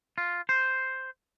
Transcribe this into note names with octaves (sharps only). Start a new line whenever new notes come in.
F4
C5